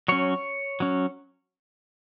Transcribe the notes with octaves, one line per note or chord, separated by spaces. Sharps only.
F#3 C#4 C#5
F#3 C#4